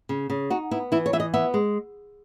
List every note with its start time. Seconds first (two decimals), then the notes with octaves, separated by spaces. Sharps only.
0.09 C#3
0.30 C#3
0.50 D#4 F#4
0.71 B3 E4
0.92 E3 E4
1.06 C#5
1.13 E3 E5
1.20 D#5
1.34 B3 E5
1.54 G#3